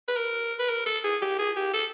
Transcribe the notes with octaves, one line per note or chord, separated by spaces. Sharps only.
B4
A#4
B4
A#4
A4
G#4
G4
G#4
G4
A4